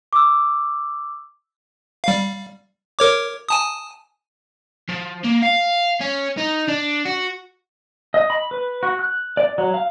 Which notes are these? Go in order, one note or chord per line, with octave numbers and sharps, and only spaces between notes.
D6 E6
G3 F5
A#4 C#5 D6
G#5 A5 D#6
F3
A#3
F5
C#4
D#4
D4
F#4
D#5
B5
B4
F#4
F#6
D5
F#3
F5